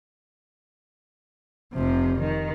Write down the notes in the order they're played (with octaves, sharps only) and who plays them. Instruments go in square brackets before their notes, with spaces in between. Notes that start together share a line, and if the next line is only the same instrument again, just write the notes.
[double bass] F1 F3 [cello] C3
[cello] D#3